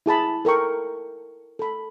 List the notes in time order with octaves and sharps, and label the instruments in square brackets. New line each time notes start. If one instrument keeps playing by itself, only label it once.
[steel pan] E4 G#4 A5 B5
A4 A#4 G5 C#6
A4 B5